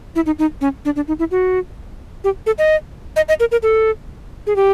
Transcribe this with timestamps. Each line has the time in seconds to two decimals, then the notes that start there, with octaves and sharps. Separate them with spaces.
0.16 E4
0.26 D#4
0.39 D#4
0.61 C#4
0.85 D4
0.96 D4
1.08 D#4
1.19 E4
1.31 F#4
2.24 G4
2.46 A4
2.58 D#5
3.16 D#5
3.29 D#5
3.40 A#4
3.52 A#4
3.63 A4
4.47 G#4
4.56 G4